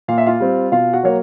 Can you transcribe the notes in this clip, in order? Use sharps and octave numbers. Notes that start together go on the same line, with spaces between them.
A#2 F5
E5
F4 F5
G3 C4
B2 F4 F5
F#4 F#5
F#3 A#3 C#5